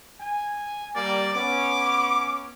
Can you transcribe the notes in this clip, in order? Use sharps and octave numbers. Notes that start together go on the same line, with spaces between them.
G#5
G3 A#3 D5
B3 C#4 D6